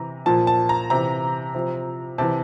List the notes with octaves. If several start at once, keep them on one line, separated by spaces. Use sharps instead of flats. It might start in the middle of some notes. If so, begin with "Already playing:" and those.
Already playing: C3 E3 A#5
A#2 F3 A5
A5
A#5
C3 E3 A#5
C3 F3
C3 E3 A5